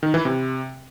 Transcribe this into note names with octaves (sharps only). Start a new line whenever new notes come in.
D#3
E3
C3